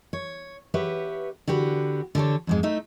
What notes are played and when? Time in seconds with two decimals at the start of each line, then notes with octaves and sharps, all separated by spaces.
0.13 C#5
0.74 G4 B4 C#5 E5 F#5
1.48 D3 F#4 G4 B4
2.15 D3 G4 A4 C#5
2.47 F2 G#2 G#3
2.63 A3 D#4 E5